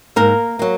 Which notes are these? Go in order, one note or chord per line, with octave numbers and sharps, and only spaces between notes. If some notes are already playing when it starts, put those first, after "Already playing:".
G#2 A#3 A#4
F#3 A#3